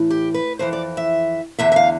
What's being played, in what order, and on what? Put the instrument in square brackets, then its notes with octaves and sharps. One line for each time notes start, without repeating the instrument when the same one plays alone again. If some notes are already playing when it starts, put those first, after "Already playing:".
Already playing: [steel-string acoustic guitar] A2 E3
G4
B4
F2 E3 C5
D5
E5
E2 D3 E5
E5
F5